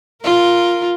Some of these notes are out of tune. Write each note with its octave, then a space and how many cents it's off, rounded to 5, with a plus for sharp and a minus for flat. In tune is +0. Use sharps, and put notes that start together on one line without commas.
F4 +0 A#4 +0